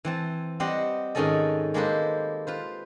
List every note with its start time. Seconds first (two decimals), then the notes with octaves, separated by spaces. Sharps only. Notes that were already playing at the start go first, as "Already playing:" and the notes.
0.05 E3 C4 A5
0.60 G3 C4 G4 C5 D#5 F#5
1.15 G#2 D#3 C#4 G#4 A4 D#5
1.74 G#3 A#3 G4 A4 B4 C5
2.47 F4 B4 C5